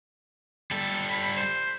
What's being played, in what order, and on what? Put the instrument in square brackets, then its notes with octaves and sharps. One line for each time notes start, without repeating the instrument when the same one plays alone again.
[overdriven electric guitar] G3 A4
[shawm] B5
C5